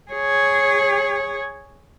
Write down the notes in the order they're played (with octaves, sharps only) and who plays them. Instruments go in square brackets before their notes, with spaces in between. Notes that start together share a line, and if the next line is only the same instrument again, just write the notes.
[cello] G#4 C#5